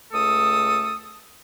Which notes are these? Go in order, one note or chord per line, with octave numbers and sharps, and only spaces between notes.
C#2 A3 A4 D#6